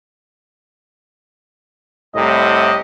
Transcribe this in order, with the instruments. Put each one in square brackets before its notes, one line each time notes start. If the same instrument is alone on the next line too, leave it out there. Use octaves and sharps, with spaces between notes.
[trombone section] C2 A2 C3 [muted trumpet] D#5